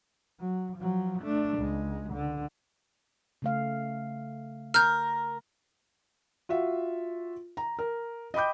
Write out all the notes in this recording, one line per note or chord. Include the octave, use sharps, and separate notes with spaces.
F#3
F3 F#3
A3 D4
C#2 G#3
C#2 D3
C#3 A3 F5
A#4 F6 G6
F4 F#4 E5
A#5
A#4
D#5 G5 B5 D6 G6